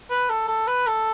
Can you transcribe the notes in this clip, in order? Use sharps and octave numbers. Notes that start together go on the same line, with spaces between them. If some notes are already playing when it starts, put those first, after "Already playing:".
B4
A4
A4
B4
A4